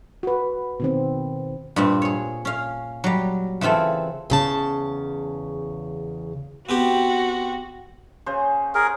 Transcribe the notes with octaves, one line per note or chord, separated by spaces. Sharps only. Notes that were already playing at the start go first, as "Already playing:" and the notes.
F#4 B4
B2 D#3 C4
G2 A#2 C4
G#4 C#5
C#4 F5
F#3 G3
C#3 E3 C4 F4 A4
E2 C#3 A5
B3 C4 F#4 G4
C#3 C5
G#4 A#4